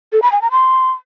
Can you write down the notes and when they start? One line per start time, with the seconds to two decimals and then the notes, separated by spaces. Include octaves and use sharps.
0.13 A4
0.22 B5
0.32 G#5
0.42 A#5
0.51 C6